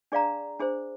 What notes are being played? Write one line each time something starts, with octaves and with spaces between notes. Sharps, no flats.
D4 G#4 D5 F5 A#5
D4 G#4 C5